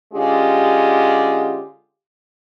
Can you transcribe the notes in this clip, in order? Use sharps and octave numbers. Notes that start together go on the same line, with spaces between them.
D3 G#3 C#4 F4 G4